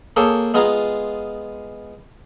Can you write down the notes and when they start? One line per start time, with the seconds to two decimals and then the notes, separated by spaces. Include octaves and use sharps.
0.16 A#3 G#4 A4 C#5 G5 A5
0.54 G#3 B3 F4 G#4 A#5